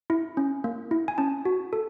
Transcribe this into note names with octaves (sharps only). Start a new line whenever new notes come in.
E4
C#4
A#3
E4
G#5
C#4 A5
F#4
A4